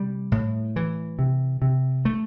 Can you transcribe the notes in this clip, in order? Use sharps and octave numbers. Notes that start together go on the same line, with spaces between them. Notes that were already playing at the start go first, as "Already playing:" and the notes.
Already playing: C3 G3
A2
E3
C3
C3
A3